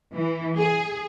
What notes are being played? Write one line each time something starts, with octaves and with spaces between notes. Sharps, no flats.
E3
G#4